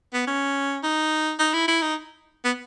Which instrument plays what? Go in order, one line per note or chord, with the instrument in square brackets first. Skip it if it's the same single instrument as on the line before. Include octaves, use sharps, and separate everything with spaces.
[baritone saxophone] B3
C#4
D#4
D#4
E4
E4
D#4
B3